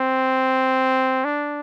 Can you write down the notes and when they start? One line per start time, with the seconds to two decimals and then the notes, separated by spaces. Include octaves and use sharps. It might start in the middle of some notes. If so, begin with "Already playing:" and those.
Already playing: C4
1.25 D4